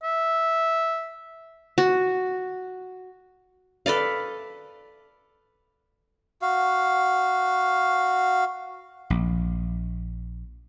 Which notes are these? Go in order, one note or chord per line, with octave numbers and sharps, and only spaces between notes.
E5
F#4
A4 B4 D5 F5
F#4 F5
A#1